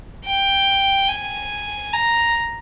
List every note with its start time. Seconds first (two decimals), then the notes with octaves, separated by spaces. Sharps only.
0.25 G5
1.09 G#5
1.93 A#5